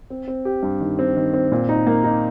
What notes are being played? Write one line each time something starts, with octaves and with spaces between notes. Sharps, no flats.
C4
C4
G4
G2
D#3
C4
D#3
C4
A#2
D#4
A#3
D#4